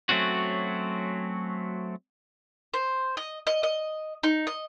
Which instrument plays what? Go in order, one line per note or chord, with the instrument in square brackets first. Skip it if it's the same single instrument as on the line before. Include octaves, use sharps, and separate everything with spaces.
[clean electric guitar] F#3 A3 C4 C#4 F#4
[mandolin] C5
D#5
D#5
D#5
D#4
D#5